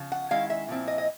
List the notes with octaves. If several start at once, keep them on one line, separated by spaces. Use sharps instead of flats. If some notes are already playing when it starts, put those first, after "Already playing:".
Already playing: C#3 F3
F#5
D#3 G#3 C#4 E4 F5
E5
A#2 F3 C4 E4
D#5
D#5